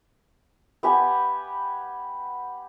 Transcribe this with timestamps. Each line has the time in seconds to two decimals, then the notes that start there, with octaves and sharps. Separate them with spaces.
0.83 B3 G4 G#5